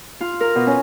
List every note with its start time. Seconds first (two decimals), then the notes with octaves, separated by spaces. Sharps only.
0.21 F4
0.41 A#4
0.55 B2
0.67 C#4